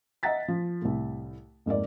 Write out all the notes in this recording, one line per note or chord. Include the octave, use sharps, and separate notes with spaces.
D#5 E5 F#5 A#5 A6 B6
F3
C2 A2
F2 G#2 A#3 D5